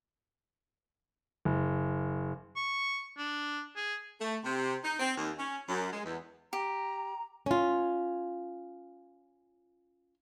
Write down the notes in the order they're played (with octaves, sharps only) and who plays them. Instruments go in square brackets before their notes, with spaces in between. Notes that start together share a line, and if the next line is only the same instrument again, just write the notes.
[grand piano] F#1
[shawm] C#6
D4
G#4
[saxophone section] A3
C3
D#4
C4
D#2
C#4
F#2
G#3
E2
[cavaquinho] G4 [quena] A#5
[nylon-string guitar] C#4 F4